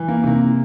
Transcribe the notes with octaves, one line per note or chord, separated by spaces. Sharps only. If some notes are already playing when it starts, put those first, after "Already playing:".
Already playing: E3
A#3
C3 A#3